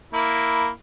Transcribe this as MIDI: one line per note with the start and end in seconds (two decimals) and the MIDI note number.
0.13 0.68 58
0.13 0.68 64